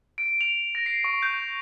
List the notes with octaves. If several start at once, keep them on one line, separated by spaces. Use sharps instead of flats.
D7
F7
A#6
C7
C#6
G6